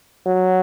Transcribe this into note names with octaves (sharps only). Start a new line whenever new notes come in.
F#3